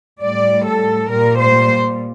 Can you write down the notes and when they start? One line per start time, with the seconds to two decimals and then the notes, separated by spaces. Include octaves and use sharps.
0.21 A2 G3 D5
0.65 A4
1.09 A#2 G3 A#4
1.38 C5